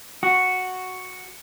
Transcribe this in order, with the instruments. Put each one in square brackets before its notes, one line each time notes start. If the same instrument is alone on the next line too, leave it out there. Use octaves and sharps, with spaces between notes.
[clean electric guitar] F#4